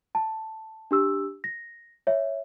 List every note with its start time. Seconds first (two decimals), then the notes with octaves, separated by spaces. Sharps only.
0.15 A5
0.91 D4 G4 E6
1.44 A#6
2.07 C#5 E5